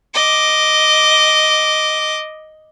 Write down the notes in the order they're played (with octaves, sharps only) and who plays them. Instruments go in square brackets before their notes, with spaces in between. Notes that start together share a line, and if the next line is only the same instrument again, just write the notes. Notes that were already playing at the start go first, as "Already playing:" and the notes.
[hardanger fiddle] D#5 D6